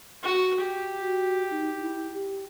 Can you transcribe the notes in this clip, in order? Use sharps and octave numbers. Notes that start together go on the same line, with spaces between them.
F#4
G4
F#4
D#4
E4
G4